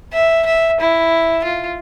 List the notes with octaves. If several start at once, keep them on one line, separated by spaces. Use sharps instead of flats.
E5
E5
E4
F4